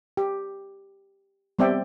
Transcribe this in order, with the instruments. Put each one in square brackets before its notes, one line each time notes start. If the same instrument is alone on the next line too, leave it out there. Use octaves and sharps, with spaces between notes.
[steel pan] G4
G3 B3 C4 D5 E5 G5